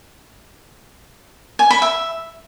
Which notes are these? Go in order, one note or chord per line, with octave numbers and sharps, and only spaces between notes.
G#5
B5
E5